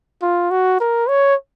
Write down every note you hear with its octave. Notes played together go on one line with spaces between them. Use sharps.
F4
F#4
A#4
C#5